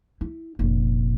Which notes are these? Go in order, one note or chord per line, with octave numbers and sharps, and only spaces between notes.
E4
F1 A#2